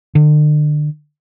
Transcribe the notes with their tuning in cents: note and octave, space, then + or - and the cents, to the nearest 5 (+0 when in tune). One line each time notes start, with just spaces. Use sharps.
D3 +35